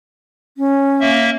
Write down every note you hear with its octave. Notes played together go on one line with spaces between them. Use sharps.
C#4
A#3 E5